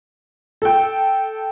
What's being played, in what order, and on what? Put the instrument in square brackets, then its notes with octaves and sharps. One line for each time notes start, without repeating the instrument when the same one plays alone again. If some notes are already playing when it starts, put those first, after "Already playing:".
[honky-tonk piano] A4 G5